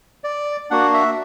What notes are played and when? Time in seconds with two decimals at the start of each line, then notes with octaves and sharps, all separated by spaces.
0.24 D5
0.71 A#3 D4 F#4 F#5
0.94 E5